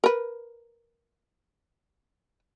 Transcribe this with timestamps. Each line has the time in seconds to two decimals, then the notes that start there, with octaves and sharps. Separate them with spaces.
0.04 A#4 B4